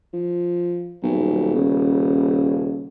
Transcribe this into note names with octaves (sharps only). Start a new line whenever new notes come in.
F3
D#1 B1
C#3